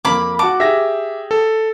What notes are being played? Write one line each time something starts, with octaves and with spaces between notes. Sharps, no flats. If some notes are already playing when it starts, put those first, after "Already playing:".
F2 A#3 B5 D6
F#4 F#5 A5 D6
G4 G#4 E5 A#6
A4